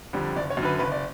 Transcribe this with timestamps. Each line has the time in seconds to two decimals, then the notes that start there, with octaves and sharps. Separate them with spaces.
0.13 F2 D3 G3
0.36 F#1 D5
0.50 C#5
0.57 F#2
0.62 D3 B4
0.79 F#1 B4
0.92 D5